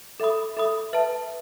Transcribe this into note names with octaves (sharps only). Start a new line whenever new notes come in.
A4 E5 B5 D#6
A4 E5 B5 D#6
B4 E5 A5